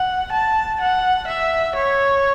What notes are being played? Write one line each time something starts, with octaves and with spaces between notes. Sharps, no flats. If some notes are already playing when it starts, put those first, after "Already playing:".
Already playing: F#5
A5
F#5
E5
C#5